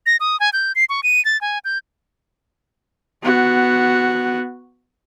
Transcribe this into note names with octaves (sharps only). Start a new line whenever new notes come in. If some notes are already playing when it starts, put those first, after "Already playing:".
A#6
D#6
G#5
G6
C7
C#6
D#7
A6
G#5
G6
B3 F#4